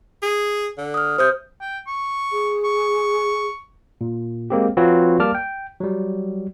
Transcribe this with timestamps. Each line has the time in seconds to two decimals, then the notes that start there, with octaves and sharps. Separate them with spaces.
0.22 G#4
0.78 D3
0.94 D#6 F6
1.18 C3 C5 D#6 G6
1.61 G5
1.87 C#6
2.32 G#4
2.64 C#6
4.01 A#2
4.50 G#3 A#3 C4 G4
4.77 F3 C4 F4 F#4 B4 C#5
5.19 G3 A#3 D5 A5 D6 F6
5.35 G5
5.80 F#3 G3